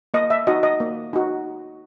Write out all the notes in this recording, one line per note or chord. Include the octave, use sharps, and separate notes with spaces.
A#3 D#5
E5
D#4 F#4 D#5
D#5
A#3
D#4 F#4